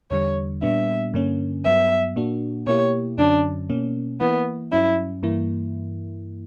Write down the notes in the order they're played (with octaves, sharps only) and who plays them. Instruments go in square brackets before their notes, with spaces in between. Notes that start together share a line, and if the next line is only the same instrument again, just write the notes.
[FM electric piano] E2 D3 G3 [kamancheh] C#5
[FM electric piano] A#2 G3 B3 D4 [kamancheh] E5
[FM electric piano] G2 D3 A#3 C#4
[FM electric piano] G2 F#3 B3 [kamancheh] E5
[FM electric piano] A#2 A#3 D4 F#4
[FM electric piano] B2 A#3 E4 G4 [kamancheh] C#5
[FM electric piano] F#2 D3 F#3 C#4 [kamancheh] D4
[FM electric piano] B2 A#3 C#4
[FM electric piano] E3 A#3 E4 [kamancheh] B3
[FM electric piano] G2 F#3 C#4 [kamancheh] E4
[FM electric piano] G2 E3 A#3 E4